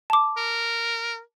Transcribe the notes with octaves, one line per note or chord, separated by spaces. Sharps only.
A5 D6
A#4